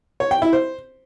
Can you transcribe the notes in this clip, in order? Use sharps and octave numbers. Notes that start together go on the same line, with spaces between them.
C#5
G5
E4
C5